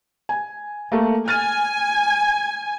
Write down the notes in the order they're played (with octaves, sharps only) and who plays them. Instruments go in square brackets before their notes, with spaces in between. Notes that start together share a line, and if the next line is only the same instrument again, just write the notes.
[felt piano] G#5
A3 A#3
[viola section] G#5 [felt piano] F6 A6 D#7